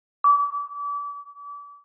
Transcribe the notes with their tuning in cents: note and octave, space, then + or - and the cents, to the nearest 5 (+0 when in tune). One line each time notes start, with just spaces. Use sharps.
D6 -35